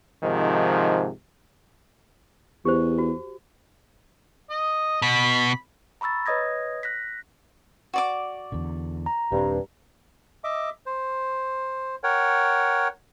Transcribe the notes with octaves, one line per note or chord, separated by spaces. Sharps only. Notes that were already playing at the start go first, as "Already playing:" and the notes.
G#2 C3 D#3 F3
E2 G4 C5
F#4
D#5
B2 B5
A#5 B5 C#6 E6 A6
B4 C#5 D#5 D#6 G#6 A#6
F#6 A#6 B6
F#4 D5 D6
E2 D3
A#5
D#1 G2 C4
D#5 E5 D6
C5
A#4 C#5 F#5 G5